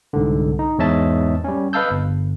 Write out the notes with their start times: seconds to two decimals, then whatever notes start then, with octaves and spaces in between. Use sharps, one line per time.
0.13 C2 G#2 D3
0.59 D#4
0.79 E2 G#2 C#5 D#5 E5 A5
1.44 G3 C#4
1.73 B4 D#5 F5 A5 E6 G6
1.91 G1